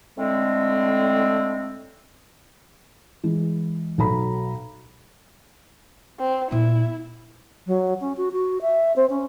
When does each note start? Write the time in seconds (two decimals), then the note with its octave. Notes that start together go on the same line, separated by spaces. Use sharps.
0.18 A2 D3 G#3 C4
3.24 E3 G#3
3.98 B1 F#3 A4 A#5 B5
6.20 C4
6.51 A#2 B3 E4
7.67 F#3
8.01 C#4
8.17 F#4
8.32 F#4
8.62 E5
8.96 C4
9.10 C#4